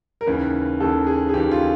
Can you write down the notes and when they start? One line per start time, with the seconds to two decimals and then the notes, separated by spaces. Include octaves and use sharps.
0.21 A#4
0.26 D#2 C#3 E3 B4
0.80 D#2 C#3 E3 A4
1.07 G#4
1.29 G#4
1.33 D#2 C#3 E3 G4
1.51 F4